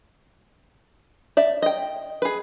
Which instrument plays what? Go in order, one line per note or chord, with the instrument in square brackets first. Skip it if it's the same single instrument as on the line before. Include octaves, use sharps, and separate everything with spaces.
[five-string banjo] D5 E5
D#5 G5
G#4 B4